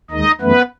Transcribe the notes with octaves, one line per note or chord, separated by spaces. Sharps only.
D#2 D#3 G#3 D#4 D#5
F#2 E3 A3 B3 B4